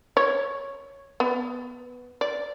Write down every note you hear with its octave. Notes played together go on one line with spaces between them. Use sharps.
C#5
B3
D5